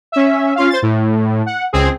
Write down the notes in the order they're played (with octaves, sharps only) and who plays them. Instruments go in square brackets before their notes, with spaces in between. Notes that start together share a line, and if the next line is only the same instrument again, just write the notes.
[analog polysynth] C#4 E5
C#4 F4 F5
C5 A6
A2
F#5
C#2 C4 G#4